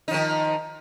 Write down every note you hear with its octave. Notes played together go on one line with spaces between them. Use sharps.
D#3 F3 D#4